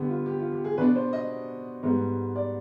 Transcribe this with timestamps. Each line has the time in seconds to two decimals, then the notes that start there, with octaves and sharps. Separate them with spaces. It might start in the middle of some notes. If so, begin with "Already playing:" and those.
Already playing: D3 G3 B3 G4
0.09 F4
0.26 G4
0.39 F4
0.52 G4
0.64 G#4
0.78 B2 B3 D4 B4
0.96 C5
1.13 D#5
1.83 G#2 G3 B3
2.36 D5